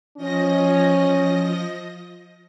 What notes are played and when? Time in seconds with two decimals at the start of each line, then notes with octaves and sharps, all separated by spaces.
0.17 F3 C#4 D#5 A#6